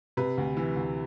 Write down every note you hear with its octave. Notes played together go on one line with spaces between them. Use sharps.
C3 B4
D2
E3
D2